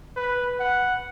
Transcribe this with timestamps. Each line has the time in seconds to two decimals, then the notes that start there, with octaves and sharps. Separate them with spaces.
0.16 B4
0.60 F#5